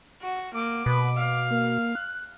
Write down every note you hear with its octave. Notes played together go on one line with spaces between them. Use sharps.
F#4
A#3 D6
B2 B4
F5
A#3
F#6